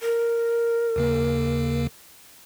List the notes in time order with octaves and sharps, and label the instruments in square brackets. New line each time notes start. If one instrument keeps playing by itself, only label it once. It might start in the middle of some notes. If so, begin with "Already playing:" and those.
[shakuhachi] A#4
[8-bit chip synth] D#2 C#3 A#3